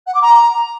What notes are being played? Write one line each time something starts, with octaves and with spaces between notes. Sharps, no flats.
F#5
D6
A#5